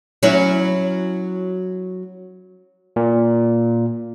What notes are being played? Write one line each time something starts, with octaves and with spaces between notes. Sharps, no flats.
F#3 C#4 E4
A#2